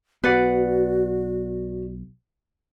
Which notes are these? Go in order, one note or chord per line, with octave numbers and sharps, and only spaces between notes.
B1 B3 F#4 B4 D5 F#5